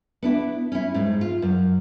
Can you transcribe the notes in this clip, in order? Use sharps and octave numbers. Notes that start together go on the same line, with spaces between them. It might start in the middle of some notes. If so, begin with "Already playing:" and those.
B3 D4 E4
C#4 E4
G#2 G#3
F4
F#2